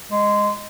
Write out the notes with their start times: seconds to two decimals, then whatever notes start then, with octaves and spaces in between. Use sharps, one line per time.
0.12 G#3